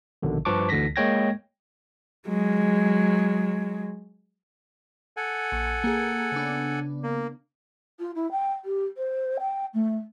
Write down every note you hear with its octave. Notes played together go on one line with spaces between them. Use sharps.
A#1 B2 D3 D#3
G2 F3 B4 A5 C#6 D6
D2 D3 E3 A#6 B6
G#3 A#3 C#5 G5 G#6 A#6
F#3 G#3
A4 F#5 G#5
A#1
A#3 G#4
C#3 B3 D4
A#3
F4
E4
G5
G4
C5
G5
A3